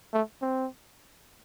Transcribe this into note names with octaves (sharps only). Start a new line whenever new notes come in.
A3
C4